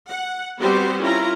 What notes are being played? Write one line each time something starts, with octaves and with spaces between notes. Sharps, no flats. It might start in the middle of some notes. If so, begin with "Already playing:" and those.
F#5
G3 B3 C4 F#4 G4 C5
C#4 E4 F4 A#4 A#5